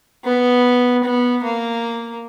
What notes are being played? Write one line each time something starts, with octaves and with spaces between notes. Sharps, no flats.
B3
B3
A#3